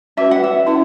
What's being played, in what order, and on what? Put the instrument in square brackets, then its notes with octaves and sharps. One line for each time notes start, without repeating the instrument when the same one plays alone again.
[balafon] C#4 F#4 B4 [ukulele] E5
[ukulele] F#5
E5
[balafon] C#4 E4 B4